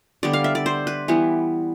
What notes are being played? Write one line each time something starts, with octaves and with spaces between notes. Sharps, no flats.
D3 G3 B3 D5
F5
E5
D5
C5
B4
E3 G3 B3